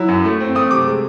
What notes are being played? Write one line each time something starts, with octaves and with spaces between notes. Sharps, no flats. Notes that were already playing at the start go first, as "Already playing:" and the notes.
Already playing: F#3 E4
F#2
A3
C4
A3 D#6
C3 D6
G#3